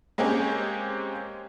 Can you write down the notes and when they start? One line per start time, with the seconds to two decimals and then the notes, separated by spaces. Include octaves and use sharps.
0.18 G#3 A#3 C4 C#4 G4 G#4